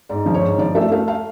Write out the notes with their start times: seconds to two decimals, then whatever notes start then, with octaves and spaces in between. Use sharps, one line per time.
0.09 G#2 D5
0.26 F3
0.34 C#5
0.42 G#2
0.58 F3 D5
0.75 A3 E5
0.91 A3 F5
1.08 F5